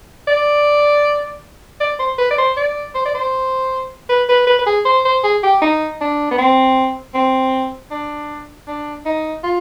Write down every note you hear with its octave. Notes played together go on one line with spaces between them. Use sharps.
D5
D5
C5
B4
D5
C5
D5
C5
D5
C5
B4
B4
B4
B4
G#4
C5
C5
G#4
G4
D#4
D4
B3
C4
C4
D4
D4
D#4
F4